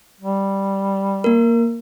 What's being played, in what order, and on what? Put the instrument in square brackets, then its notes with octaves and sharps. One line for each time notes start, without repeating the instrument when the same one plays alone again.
[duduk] G3
[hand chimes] A#3 A#4